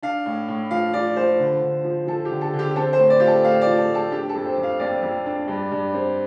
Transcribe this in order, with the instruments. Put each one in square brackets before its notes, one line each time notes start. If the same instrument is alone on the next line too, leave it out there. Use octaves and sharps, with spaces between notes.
[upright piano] D4 F5
A2
A2
F3 F5
F3 D5
F3 C5
D3
D3
F3
F3 A4
G4
D3
A4
D3
G4
C4 A4
C5
A2
D5
F4 G4
A4
A2 F5
D5
F3
A4
A2
A4
D4 G4
A4
F2
C5
F2
F5
F2 D5
F2
D4
G2
G2
C4